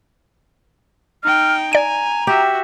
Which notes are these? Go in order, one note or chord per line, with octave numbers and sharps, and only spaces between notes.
D#4 G5 F6
D5 G#5 A#5 D7
F#4 G4 E5